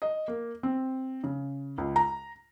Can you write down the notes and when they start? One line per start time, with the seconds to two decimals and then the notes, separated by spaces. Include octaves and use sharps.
0.02 D#5
0.28 A#3
0.63 C4
1.24 C#3
1.78 C#2
1.96 A#5